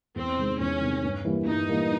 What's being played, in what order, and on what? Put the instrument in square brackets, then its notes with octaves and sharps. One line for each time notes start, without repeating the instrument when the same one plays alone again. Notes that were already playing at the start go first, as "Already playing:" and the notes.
[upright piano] E2 [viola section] C4
[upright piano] C3 D#3 G#3
[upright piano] E2 [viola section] C#4
[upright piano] C3 D#3 G#3
G2
E3 G3 A#3
[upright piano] G2 [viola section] D#4
[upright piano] E3 G3 A#3